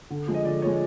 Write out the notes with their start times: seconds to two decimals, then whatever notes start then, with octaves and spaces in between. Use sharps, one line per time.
0.10 D3
0.28 F3 G#3
0.34 D#5
0.45 D3 D5
0.62 F3 C#5
0.66 G#3